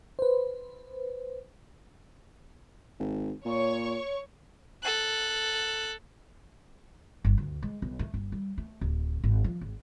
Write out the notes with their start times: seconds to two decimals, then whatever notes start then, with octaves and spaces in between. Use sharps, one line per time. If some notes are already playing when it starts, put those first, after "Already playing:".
0.19 B4 C5
3.00 G#1
3.45 A#2 C#5 C#6
4.83 A4 F#6
7.24 G1
7.38 D2
7.63 G#3
7.82 B1
7.99 A3
8.14 G1
8.32 G3
8.58 A3
8.81 D1
9.24 G#1
9.44 F3
9.61 G#1